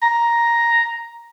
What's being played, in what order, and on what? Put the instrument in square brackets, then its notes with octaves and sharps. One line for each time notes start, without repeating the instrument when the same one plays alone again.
[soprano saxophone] A#5